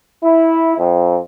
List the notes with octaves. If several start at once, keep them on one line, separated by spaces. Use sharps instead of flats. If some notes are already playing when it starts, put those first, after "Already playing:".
E4
F2